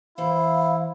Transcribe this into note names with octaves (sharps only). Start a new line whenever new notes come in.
E3 E4 C5 F5